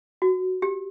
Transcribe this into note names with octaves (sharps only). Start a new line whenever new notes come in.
F#4
G4